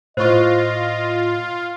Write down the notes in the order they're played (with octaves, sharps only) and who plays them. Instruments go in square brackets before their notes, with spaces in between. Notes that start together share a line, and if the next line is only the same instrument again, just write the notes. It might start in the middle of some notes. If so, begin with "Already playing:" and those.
[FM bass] A2 [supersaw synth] F4 [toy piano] C5 C#6 [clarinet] D#5